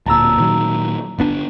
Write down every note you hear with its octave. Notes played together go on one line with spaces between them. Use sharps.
D1 A#2 A5 A#5 E6
A#2 D#3 F#3
G1 B3 D4